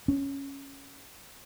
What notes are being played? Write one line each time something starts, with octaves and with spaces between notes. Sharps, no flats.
C#4